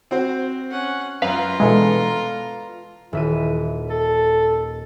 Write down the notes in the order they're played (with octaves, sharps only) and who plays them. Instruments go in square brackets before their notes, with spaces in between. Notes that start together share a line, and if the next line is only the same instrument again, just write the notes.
[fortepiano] C4 F#4 C5
[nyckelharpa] C#4 F#5
[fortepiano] F#2 [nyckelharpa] F4 A#5 [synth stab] B4 F5
[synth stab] B2 E3 G#3 [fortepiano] B3 D4 A4
[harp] D#1 E5 D#7 [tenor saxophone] E3
[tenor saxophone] A4